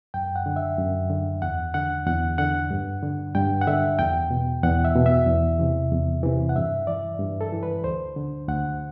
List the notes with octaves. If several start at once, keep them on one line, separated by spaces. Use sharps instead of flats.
F#2 G5
F#5
D3
E5
F#2
D3
E2 F#5
D3 F#5
E2 F#5
D3 F#5
G2
D3
G2 G5
F#5
D3 E5
E2 G5
B2
E2 F#5
E5
B2
E5
E2
C3 E3
E2
C3 E3
F#5
G2 E5
E3 D5
G2
A4
E3
B4
D2 C5
D3
D2 F#5